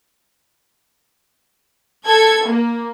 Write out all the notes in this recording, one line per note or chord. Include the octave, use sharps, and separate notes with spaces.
A4 G#6
A#3